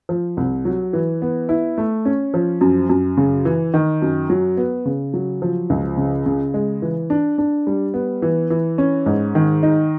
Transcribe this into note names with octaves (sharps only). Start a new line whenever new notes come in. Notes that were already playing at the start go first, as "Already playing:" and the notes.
F3
C2
F#3
E3
B3
E4
A3
C#4
F3
F#2
F#2
C#3
E3
D#3
F#2
F#3
B3
C#3
F#3
F3
C#2
C#3
C#3
G#3
E3
D4
D4
G3
B3
E3
E3
C#4
G#2
D#3
D#4